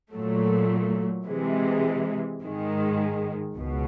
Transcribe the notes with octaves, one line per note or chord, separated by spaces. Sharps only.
A#2 F#3 A3
C3 E3 G#3
G#2 D#3 G#3
C#2 B2